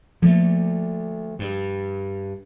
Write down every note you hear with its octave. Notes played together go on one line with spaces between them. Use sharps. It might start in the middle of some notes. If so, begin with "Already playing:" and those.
D3 F3 A3 A#3
G2